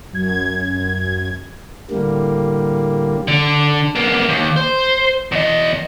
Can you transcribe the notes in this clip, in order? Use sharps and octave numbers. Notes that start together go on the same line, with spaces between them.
F#2 G#6
A2 D3 G3 A#3
D3
A#3 B3
D#2
C5
E2 D#5